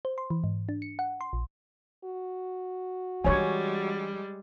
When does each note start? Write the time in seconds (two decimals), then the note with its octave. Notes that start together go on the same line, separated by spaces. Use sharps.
0.05 C5
0.18 C6
0.30 E3
0.44 G#2
0.69 D4
0.82 C#7
0.99 F#5
1.21 C6
1.33 A#1
2.05 F#4
3.24 E3 G3 G#3 D4 C#5 G#5